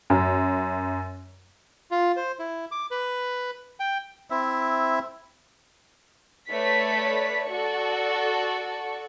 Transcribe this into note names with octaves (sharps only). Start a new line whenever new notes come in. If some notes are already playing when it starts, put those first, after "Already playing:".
F#2
F4
C5
E4
D6
B4
G5
C4 E4 E5
A3 B4 C#5 D5 B6
F#4 A4 D5 C#6